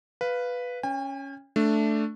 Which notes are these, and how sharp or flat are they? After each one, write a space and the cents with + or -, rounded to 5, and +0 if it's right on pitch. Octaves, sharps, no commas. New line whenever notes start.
B4 +0 F5 +0
C#4 +0 G5 +45
A3 +0 D4 +0 D5 +0